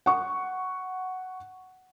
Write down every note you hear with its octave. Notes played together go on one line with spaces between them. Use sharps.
F#5 C#6